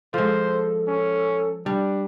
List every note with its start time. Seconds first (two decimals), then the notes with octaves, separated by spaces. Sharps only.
0.14 F3 G#3 A4 C5
0.87 C#4
1.66 G3 D4